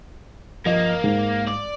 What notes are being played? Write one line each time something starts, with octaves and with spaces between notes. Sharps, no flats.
G2 F3 A#3 D#5
G#2
D5